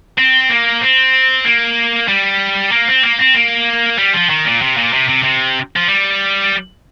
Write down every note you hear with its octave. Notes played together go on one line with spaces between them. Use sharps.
C4
A#3
C4
A#3
G3
A#3
C4
A#3
C4
A#3
G3
F3
D#3
A#2
C3
A#2
C3
C3
C3
F3
G3